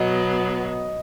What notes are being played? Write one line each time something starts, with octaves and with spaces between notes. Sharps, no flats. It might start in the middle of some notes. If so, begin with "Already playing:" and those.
Already playing: B2 F#3 B3 D#5